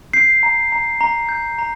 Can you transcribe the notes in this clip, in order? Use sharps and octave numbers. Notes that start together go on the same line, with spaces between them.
G6 C7
A#5
A#5
A#5
G6
A#5